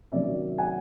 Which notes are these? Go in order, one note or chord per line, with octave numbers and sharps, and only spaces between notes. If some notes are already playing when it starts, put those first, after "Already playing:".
C3 D#3 F#3 A#3 C#4 D5 E5
F#5 G#5